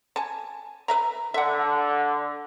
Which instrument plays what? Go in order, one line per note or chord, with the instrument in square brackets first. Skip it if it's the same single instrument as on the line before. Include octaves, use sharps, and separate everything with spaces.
[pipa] G#5 A5
B4 E5 A#5
[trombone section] D3 [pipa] E5 F#5